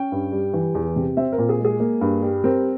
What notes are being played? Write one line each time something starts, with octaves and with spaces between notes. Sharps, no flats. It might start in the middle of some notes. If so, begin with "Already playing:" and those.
Already playing: C#4 G5
G2
G3
E3
E2
C3
C4 E5
A#4
A#2
G#4
G#3
G#4
A#3
G2
G3
C4 A#4